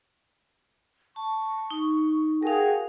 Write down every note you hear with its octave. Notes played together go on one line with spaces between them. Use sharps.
A5 C#6
D#4
F#4 G#4 A#4 F5 G5